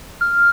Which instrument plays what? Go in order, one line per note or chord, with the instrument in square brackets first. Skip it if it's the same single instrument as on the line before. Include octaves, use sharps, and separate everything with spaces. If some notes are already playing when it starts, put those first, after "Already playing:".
[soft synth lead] F6